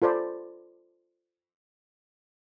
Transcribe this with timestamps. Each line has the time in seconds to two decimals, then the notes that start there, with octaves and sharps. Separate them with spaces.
0.02 F4 A4 C5 D5 B5